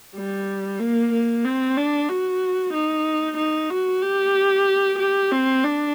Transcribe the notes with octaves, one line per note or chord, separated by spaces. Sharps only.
G3
A#3
A#3
C4
D4
F#4
D#4
D#4
F#4
G4
G4
C4
D4